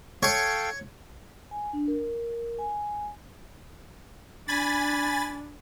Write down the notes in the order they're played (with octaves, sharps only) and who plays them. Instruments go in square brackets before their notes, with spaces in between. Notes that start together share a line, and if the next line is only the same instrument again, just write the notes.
[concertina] A4 F5 G5 [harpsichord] C#5
[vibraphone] G#5
D4
A#4
G#5
[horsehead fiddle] D4 [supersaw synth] G#5 B5 A6